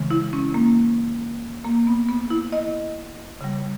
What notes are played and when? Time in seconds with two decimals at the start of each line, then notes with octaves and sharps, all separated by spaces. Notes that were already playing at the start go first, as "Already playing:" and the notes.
Already playing: C#3 E3 G#3
0.10 E4
0.33 C#4
0.54 A#3
1.65 A#3
1.87 B3
2.09 B3
2.30 E4
2.52 D#5
3.41 C#3 G3